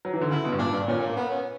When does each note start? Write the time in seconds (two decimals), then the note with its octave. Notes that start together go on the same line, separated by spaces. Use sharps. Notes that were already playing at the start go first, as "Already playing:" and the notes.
0.05 F#3
0.13 E3
0.21 D3
0.31 C#3 E4
0.45 B2
0.52 G2
0.59 A#2 D4
0.73 G2
0.88 A#2 C#4
1.01 A#3
1.16 B3
1.30 C#4